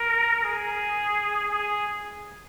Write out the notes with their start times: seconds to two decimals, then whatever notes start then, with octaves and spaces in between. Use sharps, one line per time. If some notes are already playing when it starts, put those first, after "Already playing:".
Already playing: A#4
0.44 G#4
1.51 G#4